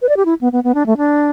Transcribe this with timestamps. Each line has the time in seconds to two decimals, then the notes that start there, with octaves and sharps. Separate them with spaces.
0.02 B4
0.09 D5
0.17 G4
0.25 E4
0.41 B3
0.52 B3
0.64 B3
0.75 D4
0.86 A3
0.97 D4